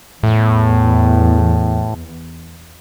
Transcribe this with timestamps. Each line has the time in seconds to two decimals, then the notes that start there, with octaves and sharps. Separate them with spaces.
0.23 E2 A2